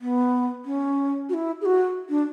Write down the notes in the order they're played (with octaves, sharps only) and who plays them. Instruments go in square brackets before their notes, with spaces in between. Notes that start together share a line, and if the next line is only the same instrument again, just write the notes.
[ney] B3
C#4
F#4
E4
G#4
F#4
D4